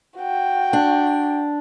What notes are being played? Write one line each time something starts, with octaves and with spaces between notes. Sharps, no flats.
F#4 G5
D4